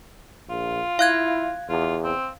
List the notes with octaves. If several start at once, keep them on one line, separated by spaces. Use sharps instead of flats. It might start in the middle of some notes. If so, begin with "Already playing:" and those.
A#1 F4
E4 F5 F#6 G#6
E2 F4
C4